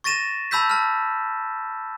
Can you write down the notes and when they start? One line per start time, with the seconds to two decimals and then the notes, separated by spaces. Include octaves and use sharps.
0.04 C#6 A6 A#6 D#7 E7
0.51 A5 B5 E6 G6 B6
0.70 A5 F6